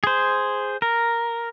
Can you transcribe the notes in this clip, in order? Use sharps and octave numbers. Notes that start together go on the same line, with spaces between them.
G#4 C5
A#4